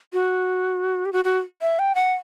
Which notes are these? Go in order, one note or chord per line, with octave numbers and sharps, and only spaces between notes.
F#4
G4
F#4
F#4
E5
G5
F#5